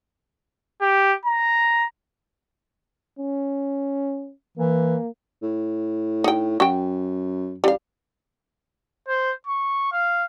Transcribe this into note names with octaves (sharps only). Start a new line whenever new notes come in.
G4
A#5
C#4
E3 A#3
A2
D#4 G5
F#2 F#4 G5
A1 G3 F5
C5
C#6
F5